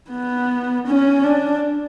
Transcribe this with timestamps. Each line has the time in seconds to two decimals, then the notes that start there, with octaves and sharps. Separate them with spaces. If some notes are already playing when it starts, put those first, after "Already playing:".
0.11 B3
0.87 C#4
1.24 D4